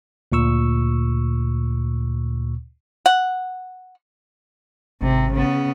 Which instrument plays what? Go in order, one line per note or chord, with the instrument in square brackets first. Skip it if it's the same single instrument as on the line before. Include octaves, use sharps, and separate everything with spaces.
[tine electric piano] D2 A#2 C#6 E6
[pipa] F#5
[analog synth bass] G#1 [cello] C3
[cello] C#3 B3